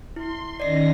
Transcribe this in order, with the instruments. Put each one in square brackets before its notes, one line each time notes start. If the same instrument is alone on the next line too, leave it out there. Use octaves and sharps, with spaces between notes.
[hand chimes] E4 [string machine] C6
[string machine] D#3 C#4 A#6 [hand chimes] D5 D#5 C7